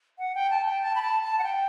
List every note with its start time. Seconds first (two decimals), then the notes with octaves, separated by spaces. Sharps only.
0.19 F#5
0.35 G5
0.50 A5
0.66 G5
0.82 A5
0.95 B5
1.02 A5
1.23 A5
1.39 F#5
1.44 G5